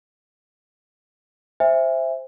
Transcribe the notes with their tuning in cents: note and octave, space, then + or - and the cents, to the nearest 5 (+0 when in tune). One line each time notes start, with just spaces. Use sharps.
C5 +0 E5 +0 G#5 -30